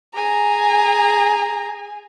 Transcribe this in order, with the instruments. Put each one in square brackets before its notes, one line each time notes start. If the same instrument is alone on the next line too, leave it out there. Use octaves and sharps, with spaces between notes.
[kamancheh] G#4 G#5 [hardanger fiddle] A#5